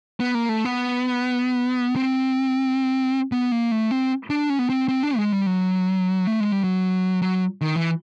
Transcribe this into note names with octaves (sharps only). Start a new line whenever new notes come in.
B3
A#3
A3
B3
C4
B3
A#3
A3
C4
D4
C#4
B3
C4
C4
D4
G#3
G3
F#3
A3
G#3
G3
F#3
F#3
D#3
E3